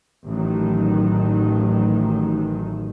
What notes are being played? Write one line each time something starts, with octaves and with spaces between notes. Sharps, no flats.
A1 D#3 F#3